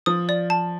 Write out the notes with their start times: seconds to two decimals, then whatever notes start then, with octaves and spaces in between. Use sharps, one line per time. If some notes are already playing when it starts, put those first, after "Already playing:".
0.06 F3 D#6
0.29 D5
0.50 A5